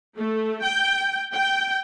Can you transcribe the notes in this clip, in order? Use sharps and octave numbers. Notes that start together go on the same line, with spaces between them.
A3
G5
G5